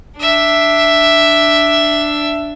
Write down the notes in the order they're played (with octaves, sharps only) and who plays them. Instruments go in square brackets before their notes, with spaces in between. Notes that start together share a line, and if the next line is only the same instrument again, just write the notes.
[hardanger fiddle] D4 E5